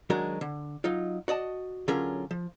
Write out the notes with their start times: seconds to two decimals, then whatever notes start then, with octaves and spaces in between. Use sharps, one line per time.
0.10 D#3 F#3 G#3 D4 F#4 A#4
0.41 D3
0.84 F#3 D#4 F4
1.28 F#4 D5 D#5 A5
1.88 D3 F#3 C#4 F4 G#4 A#4
2.31 F3